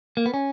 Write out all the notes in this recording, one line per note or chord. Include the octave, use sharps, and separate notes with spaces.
A#3
B3
C#4